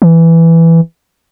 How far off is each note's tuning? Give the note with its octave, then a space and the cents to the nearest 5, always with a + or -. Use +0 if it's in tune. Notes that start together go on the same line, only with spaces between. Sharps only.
E3 +5